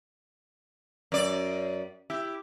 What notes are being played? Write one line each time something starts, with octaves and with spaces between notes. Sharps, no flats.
F#2 D5
E4 G4